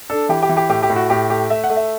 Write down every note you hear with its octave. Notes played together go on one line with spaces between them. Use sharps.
D4 A4
E3 G4
G4
E3
G4
A2 G4
G4
A2
F#4
A2 G4
A3 G4
A3 E5
F#5
A3
E5